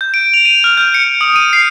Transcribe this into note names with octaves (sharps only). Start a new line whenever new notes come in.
G6
D7
F7
D#7
F6
G6
C#7
D#6
D#7
C7